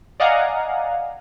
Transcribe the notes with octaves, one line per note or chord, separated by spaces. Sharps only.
D5 D#5 F5 F#5 G#5 A#5